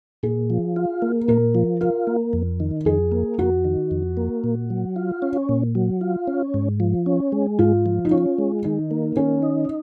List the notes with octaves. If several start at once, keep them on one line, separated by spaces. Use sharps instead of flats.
A#2 G#4
F3
F4
A#3
A#2 A#4
F3
F4 A#4
A#3
F2
D#3
F2 G#4
A#3
F2 F#4
D#3
F2
A#3
A#2
F#3
F4
C#4
A#2
F#3
F4
C#4
G#2
F3
C#4
G#3
G#2 F4
F3
D#4
C#4 F4
G#3
D#3 D#4
A#3
D#3 C#4
D#4